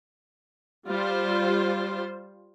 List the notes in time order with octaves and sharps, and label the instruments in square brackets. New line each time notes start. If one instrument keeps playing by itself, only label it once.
[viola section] G3 F4 C5